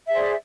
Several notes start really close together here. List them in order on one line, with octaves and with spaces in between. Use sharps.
E5 G#4 C5 D5